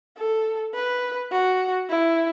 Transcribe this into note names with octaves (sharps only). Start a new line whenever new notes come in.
A4
B4
F#4
E4